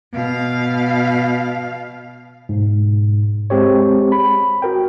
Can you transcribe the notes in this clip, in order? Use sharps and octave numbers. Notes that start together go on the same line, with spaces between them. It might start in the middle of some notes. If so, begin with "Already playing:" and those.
B2 F5
G#2 B2
G#3 C4 G4 C#5
B5
F#4 A#4 G5